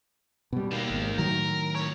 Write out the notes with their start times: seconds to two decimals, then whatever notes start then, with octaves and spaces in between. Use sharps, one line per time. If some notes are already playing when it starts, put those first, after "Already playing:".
0.53 B2 G3
0.71 D#3 A#3
0.90 G#1
1.18 A2 D#3 F#3 A#4
1.75 F2 C#5